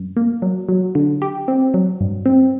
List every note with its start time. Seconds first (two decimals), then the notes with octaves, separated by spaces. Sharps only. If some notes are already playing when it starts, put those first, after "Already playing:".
Already playing: F#2
0.17 A#3
0.42 F#3
0.69 F#3
0.95 D3
1.22 G4
1.48 C4
1.74 F#3
2.01 G2
2.26 C4